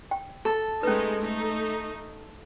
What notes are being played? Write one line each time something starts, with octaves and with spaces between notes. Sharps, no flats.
G5
A4
G#3 A3 C#4 D#4 B4
A3 D#4